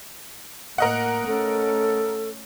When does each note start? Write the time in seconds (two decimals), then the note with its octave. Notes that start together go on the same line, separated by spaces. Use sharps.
0.78 A2 A#3 A#4 D#5 F#5
1.26 A3 C#4 A4